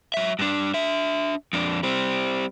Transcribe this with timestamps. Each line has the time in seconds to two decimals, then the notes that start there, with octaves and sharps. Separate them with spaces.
0.14 F#3 E5
0.39 G2 D4
0.74 D4 E5
1.53 F2 D4
1.83 G3 C4